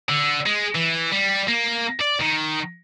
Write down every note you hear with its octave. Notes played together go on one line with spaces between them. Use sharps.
D3
G#3
E3
G3
A#3
D5
D#3